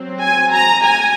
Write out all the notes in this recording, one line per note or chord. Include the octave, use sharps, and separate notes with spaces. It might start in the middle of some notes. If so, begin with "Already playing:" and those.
Already playing: F#3 C4
G#5
A#5
G#5